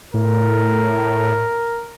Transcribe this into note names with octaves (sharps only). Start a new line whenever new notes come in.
A2 A#4